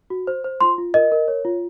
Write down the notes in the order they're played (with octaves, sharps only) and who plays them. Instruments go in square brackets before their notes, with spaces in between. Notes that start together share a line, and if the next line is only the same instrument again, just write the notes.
[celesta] F#4
C5
C5
F4 C6
F4
A#4 D#5
A#4
C#5
F4